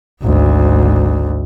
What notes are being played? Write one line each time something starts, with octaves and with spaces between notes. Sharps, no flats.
G#1 D2